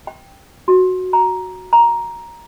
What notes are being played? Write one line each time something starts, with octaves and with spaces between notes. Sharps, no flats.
G5
F#4
A#5
A#5